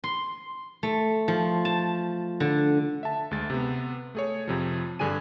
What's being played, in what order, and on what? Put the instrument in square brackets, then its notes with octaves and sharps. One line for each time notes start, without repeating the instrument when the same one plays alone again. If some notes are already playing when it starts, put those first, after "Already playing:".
[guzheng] C6
A3
F3
A5
D3
[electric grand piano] E5 A5
D2 G#3 A6
C3 B3
A3 G#4 C#5
F2 C3 F3
G2 D3 D4 G#4 G#5 D#7